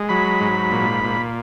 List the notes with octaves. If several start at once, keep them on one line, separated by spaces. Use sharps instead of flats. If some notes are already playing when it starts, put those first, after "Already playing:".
Already playing: G#3
F#3 B5
G#2
A#2
A#2